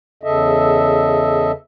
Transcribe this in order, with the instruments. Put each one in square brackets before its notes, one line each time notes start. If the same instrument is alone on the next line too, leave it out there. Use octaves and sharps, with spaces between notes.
[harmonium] E2 C#3 A4 D#5 E5